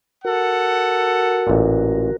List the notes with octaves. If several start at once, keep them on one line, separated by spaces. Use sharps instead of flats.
F#4 A4 A#4 F#5
A1 A#2